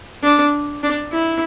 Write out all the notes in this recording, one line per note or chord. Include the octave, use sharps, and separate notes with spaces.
D4
D4
E4